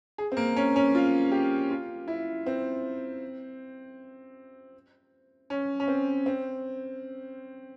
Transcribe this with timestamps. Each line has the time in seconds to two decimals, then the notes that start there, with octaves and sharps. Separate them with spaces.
0.18 G#4
0.32 C4
0.37 A#3
0.56 C#4
0.76 C#4
0.95 F4
1.32 G4
1.71 F4
2.08 E4
2.46 C4
5.50 C#4
5.80 C#4
5.88 C4
6.26 C4